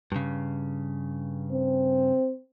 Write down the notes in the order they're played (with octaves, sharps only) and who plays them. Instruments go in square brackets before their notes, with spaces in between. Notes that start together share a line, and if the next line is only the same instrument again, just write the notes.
[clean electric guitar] G2 C#3
[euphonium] C4